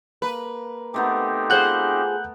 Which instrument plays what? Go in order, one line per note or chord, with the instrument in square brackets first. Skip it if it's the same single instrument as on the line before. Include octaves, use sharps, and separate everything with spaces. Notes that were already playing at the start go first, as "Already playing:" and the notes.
[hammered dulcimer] A#3 [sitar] B4
[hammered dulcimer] A3 B3 A#4 [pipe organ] C4 D#4 G4
[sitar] F4 G#4 C5 [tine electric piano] F#5 F#6 G6